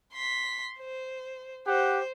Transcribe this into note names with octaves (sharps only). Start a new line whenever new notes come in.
C6 B6
C5
G4 C5 F#5